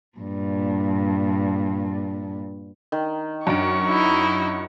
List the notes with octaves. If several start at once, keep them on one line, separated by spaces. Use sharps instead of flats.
G2 A#2
D#3
F#2 D4 C#6 D7
D#4 E4